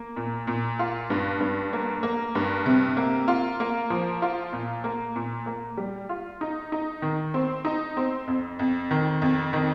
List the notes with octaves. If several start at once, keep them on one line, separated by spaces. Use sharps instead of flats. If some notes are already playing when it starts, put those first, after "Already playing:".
Already playing: A#3
A#2
A#2
F4
G2
G2
A#3
A#3
G2
C3
A#3
F4
A#3
F3
F4
A#2
A#3
A#2
A#3
G3
F4
D#4
D#4
D#3
C4
D#4
C4
F2
F2
D#3
F2
D#3